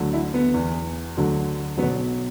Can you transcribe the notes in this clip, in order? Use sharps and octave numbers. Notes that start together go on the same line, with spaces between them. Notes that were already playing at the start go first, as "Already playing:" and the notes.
Already playing: D2 D3 F#3
E4
B3
E2 E3
D2 D3 F#3
B1 B2 F#3 B3